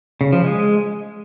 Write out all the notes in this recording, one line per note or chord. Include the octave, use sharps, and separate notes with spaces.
C#3
F3
G#3